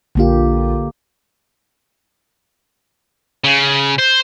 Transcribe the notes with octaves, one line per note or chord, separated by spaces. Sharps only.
A#1 D3 A#3 F4 G4
C#3
C5